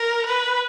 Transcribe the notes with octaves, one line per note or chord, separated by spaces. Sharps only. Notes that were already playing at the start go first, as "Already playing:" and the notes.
Already playing: A#4
B4